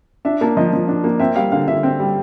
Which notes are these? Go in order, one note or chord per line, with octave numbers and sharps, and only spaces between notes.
D4 E5
A#3 A5
F3 D#5
F3
D4
A#3
C4 E5
G3 F5
D3 F5
D3 E5
C4
G3